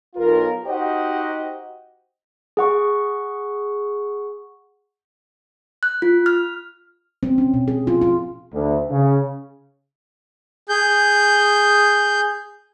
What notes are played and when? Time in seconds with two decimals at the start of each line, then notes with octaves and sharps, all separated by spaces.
0.15 B1 F4 A#4
0.64 D#4 F#4 G4 C5 D#5 F#5
2.57 G#4 F#5 C#6
5.83 F#6
6.02 F4
6.26 F6
7.23 C4
7.38 C#4
7.54 B2
7.68 G#4
7.87 F4
8.01 F4
8.53 D2
8.90 C#3
10.69 G#4 G6